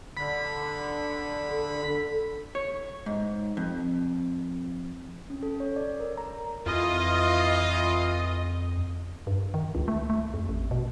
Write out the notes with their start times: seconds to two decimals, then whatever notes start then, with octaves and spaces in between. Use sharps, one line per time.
0.17 D3 B5
1.50 A4
2.55 C#5
3.06 G#2
3.57 F2
5.30 C#4
5.43 A4
5.60 C#5
5.76 D5
6.00 A#4
6.17 A#5
6.66 F2 E3 F4 D#5
9.27 G2
9.54 D#3
9.75 C#2
9.88 A3
10.10 A3
10.34 F2
10.49 A1
10.71 B2